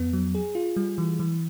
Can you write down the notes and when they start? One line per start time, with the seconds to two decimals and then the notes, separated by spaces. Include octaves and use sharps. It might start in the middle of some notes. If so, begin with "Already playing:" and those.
Already playing: F2 B3
0.13 F#3
0.35 G#4
0.55 F4
0.76 G3
0.98 E3
1.20 E3